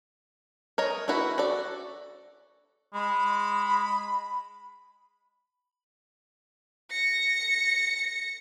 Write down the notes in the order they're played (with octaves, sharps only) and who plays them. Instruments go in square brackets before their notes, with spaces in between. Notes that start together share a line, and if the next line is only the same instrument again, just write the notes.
[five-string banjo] A#4 C#5 D#5
A#3 E4 F#4 B4
F#4 A4 D5
[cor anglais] G#3 [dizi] B5
[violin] A#6 C#7